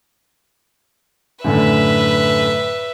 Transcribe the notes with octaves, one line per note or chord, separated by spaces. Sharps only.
F#2 A2 D3 B4 E5